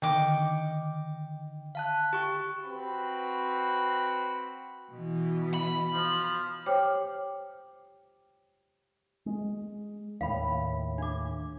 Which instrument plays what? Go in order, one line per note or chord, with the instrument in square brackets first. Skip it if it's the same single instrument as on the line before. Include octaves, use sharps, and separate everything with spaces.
[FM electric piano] D3 D#3 [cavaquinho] D#5 D6 [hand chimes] G5
[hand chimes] F5 A5 F#6
G4 C#6
[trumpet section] C4 F#4 B4 B5
[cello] B2 E3
[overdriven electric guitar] B5
[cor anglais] F3
[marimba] G4 C5 C#5 G5 D6 F6
[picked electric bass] G#3
[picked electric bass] D#2 A2 [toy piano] F5 B5
[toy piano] D4 D6